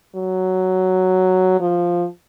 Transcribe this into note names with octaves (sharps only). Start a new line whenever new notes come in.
F#3
F3